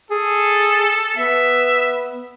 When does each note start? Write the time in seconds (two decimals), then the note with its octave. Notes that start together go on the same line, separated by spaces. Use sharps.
0.11 G#4 A4
1.17 B3 E5